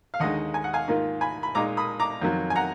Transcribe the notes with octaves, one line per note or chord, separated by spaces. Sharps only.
F5
D#2 D3 G#3 D#4 D#5 F#5
G#5
F#5
F5 G#5
G#2 D#3 A#3 F4
G#5 B5
B5
A#2 G#3 D#4 A#5 D6
B5 D#6
A#5 D6
F2 D#3 F#3
G#5
F#5 A#5